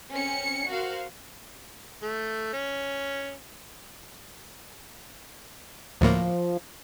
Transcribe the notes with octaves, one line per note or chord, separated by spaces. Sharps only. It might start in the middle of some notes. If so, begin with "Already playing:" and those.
C4 C#4 C#7
F#4 A#4 C5 F5
A3
C#4
D2 A2 F3 A#3